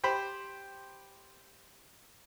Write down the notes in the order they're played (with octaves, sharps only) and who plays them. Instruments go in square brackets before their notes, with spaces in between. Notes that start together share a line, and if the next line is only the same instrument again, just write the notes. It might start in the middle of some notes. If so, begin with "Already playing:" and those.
[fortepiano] G4 C5 B5